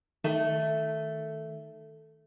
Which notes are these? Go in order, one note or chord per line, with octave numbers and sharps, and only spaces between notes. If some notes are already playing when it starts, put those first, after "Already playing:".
D#3 A3